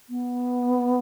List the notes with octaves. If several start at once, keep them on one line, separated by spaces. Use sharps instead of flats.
B3